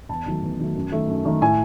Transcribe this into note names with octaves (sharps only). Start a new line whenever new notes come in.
E2 A5
D#3 F#3 A3
E2
D#3 F#3 A3
F#2
D#3 A3
F#2
D#3 A3
A2 G#5